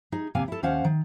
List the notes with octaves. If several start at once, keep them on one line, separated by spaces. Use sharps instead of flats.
D#4 G#4
D#2 C3 A#3 F5 G#5
E4 A4
D#2 C#4 C5 F5 F#5
D#3